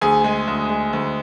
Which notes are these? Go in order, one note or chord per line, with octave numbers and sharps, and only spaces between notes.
D2 G#4 G#5
G#3
D2
G#3
D2